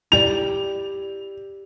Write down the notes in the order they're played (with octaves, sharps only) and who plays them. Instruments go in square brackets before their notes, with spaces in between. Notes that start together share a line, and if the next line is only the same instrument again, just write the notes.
[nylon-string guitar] E4 G4 D5 [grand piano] F7